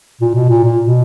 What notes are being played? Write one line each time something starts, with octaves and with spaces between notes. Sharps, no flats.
A#2
B2
A#2
A#2
B2